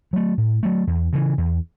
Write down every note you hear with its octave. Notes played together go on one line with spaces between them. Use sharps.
F#3 A3
A2
F#3 A3
E2
C#3 E3
E2